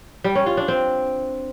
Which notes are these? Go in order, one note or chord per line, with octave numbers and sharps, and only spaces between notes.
G3
C#4
F4
D4
C4